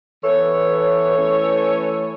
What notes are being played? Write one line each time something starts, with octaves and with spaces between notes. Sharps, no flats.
E3 B3 A4 C#5
E3 A3 C#4